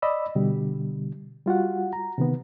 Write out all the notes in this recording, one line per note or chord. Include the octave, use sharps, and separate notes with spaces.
D5 D#5 B5 E6
B2 D3 G3
G3 F4 F#4 F#5
A#5
C3 D#3 B3